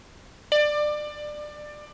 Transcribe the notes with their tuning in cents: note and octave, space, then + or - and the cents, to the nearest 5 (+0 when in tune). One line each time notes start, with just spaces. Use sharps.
D5 +20